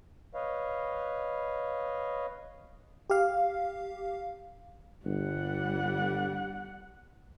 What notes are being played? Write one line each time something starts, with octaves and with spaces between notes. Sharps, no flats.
B4 C#5 D#5 F5
G4 F5
G1 G3 F#5